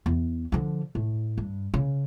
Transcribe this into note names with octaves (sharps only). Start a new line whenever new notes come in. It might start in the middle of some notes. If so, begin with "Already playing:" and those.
E2
D3 F3
A2
G2
C#3